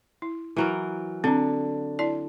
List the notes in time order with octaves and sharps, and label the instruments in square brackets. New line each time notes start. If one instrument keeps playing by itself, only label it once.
[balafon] E4
[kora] E3 F#3 A#4
[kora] D3 [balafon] C4 D4
[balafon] E4 D5 A5